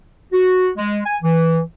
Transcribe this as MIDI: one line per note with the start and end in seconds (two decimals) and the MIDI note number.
0.33 0.69 66
0.77 0.98 56
1.06 1.16 80
1.23 1.60 52